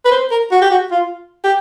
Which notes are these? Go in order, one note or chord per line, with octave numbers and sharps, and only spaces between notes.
B4
C5
A#4
F#4
G4
F#4
F4
G4